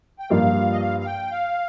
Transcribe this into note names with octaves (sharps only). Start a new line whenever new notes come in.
G5
G2 F3 A#3 F4 F5
D#5
F5
F5
G5
F5